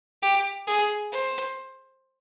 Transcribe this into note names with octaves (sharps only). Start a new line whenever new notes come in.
G4
G#4
C5